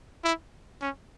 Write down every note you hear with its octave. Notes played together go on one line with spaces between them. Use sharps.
E4
C#4